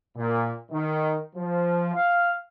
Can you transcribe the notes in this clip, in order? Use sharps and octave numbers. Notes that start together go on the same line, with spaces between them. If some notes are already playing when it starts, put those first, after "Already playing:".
A#2
D#3
F3
F5